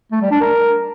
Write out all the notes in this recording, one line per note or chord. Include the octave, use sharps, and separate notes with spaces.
A3
G3
D4
A#4